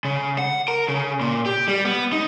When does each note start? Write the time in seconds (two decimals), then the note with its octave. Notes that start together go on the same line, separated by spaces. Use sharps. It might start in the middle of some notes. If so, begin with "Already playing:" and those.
0.05 C#3
0.39 F#5
0.68 A#4
0.88 C#3
1.21 A#2
1.46 G4
1.68 G3
1.85 B3
2.12 D#4